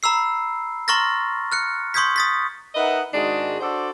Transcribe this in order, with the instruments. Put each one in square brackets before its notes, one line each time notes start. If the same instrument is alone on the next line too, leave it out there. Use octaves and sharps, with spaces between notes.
[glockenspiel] A#5 B5 E6 C7
A#5 C6 C#6 F6 A6 A#6
F6 F#6 C#7
C6 C#6 D#6 G6 G#6 B6
D#6 A6 B6
[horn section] D#4 A#4 B4 D#5 E5 F#5
G#2 D#3 G#3 D4 D#4 F#4
D4 F#4 A4 C5 D5